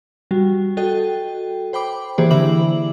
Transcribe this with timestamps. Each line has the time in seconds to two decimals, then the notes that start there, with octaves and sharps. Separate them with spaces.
0.31 G3 F#4
0.77 F#4 A4 D#5 G5
1.73 C5 G5 B5 D6
2.18 E3 A#3 G4 G#4 C5 D5
2.31 D3 E4 E5 B5 D6 F#7